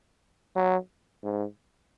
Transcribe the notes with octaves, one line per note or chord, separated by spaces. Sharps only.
F#3
G#2